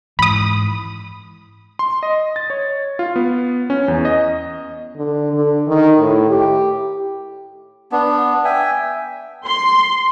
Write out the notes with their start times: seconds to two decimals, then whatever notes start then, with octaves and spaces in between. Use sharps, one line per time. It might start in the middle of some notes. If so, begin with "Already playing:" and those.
0.19 G#2 E3 B5 D#6
1.79 C6
2.03 D#5
2.36 A6
2.50 C#5
2.99 F4
3.16 B3
3.70 C#4
3.88 E2
4.05 D#5
4.97 D3
5.33 D3
5.68 D#3
5.99 A2
6.30 G4
7.92 B3 D4
8.45 E5 G5 G#5
9.46 C6